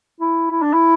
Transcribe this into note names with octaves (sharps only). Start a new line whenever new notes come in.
E4
E4
D4
E4